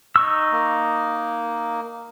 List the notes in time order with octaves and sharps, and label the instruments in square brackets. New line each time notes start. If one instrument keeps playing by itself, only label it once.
[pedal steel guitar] D#4 C#6 E6
[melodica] A#3